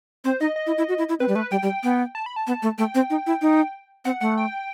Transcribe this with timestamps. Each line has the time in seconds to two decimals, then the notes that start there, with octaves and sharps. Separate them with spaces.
0.25 C4 C5
0.41 D#4 D#5
0.56 D#5
0.67 E4
0.78 E4
0.89 F#4
0.98 E4
1.09 E4
1.20 C4 B4
1.28 G3
1.35 A3 B4
1.51 G3 G5
1.63 G3
1.83 B3
2.15 A5
2.26 B5
2.36 A5
2.47 B3
2.63 A3
2.78 A3 G5
2.95 C4
3.10 D#4
3.27 E4
3.42 D#4
4.05 C4 F#5
4.21 A3 F#5
4.38 G5